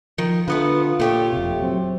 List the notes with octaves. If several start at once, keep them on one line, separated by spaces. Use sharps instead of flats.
D#3 F3
D3 A3 B3 F4 B4
A#2 A3 G4 C#5
F1 C3
F#3 C4